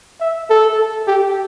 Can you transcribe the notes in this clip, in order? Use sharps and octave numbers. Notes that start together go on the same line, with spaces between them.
E5
A4
G4